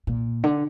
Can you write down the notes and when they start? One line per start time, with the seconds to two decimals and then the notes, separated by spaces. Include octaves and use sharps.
0.07 A#2
0.43 D3